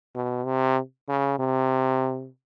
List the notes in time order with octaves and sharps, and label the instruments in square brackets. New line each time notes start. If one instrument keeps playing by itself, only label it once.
[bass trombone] B2
C3
C#3
C3